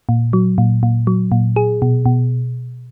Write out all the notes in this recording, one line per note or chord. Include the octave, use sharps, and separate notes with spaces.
A#2
F#3
A#2
A#2
F#3
A#2
G#4
B2
B2